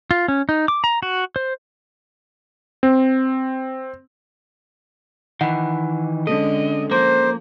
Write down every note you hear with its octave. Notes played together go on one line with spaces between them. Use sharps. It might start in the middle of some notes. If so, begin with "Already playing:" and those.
F4
C#4
D#4
D6
A#5
F#4
C5
C4
D#3 E3 F#5
D3 G#3 C#4 A4 D#5
F3 A#3 C5